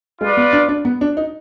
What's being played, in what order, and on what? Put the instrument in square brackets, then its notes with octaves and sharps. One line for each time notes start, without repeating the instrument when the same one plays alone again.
[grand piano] G#3 [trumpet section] F4 B4 D5
[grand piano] B3
D4
D4
B3
D4
D#4